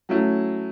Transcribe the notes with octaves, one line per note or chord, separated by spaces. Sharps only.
F#3 A3 C#4 E4